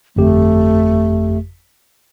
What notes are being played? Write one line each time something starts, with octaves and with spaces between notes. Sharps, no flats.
G1 F2 A3 G4